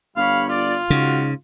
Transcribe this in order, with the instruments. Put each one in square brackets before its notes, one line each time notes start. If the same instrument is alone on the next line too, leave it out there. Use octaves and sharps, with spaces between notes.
[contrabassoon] G1 [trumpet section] G3 C#5 B5 [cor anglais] F5
[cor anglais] F4 [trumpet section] D5
[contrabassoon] G#2 [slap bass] C#3 [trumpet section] F#4